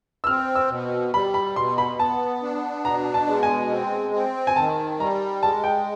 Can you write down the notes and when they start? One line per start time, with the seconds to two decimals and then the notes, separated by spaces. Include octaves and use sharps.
0.24 E6
0.27 C4 F6
0.55 E6
0.70 B2
1.13 G3 B5
1.34 B5
1.56 B2 C6
1.78 B5
1.99 B3 A5
2.42 D4
2.85 B2 A#5
3.14 A5
3.27 G#3
3.43 G#5
3.71 C4
4.14 C4
4.47 G#5
4.56 D#3 A5
5.00 G3 A#5
5.43 G#3 A5
5.64 G5